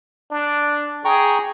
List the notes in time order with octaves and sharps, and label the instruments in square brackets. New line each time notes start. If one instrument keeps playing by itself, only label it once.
[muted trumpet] D4
[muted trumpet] G#4 [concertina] G5 A#5 C#6